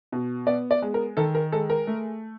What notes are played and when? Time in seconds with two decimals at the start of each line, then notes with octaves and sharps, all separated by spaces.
0.12 B2
0.47 B3 D5
0.71 D5
0.82 G#3
0.94 A#4
1.17 D#3 A4
1.35 A#4
1.52 G#3 A4
1.70 A#4
1.87 A3